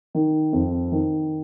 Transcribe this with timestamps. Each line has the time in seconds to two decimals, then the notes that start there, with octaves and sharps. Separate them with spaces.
0.15 D#3
0.53 F2
0.92 D#3